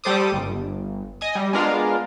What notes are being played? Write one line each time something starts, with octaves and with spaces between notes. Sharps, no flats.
G3 A4 C5 D6 D#6
G1
D#5 G#5 D#6
G3
G#3 B3 D4 F4 A#4 F5